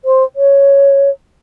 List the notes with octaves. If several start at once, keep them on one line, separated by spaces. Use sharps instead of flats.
C5
C#5